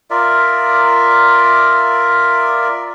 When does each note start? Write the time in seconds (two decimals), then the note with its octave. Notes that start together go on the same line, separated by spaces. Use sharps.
0.10 F4 A#4 D5 E5